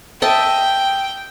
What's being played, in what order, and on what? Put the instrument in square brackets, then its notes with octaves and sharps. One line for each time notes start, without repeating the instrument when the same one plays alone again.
[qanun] D#5 E5 A5 [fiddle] G5